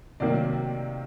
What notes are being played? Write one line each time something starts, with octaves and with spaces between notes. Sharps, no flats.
C3 D#3 F#3 A#3 D5